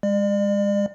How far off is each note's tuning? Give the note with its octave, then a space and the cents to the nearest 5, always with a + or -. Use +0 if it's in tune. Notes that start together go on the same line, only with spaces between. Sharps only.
G#3 -30 D5 +40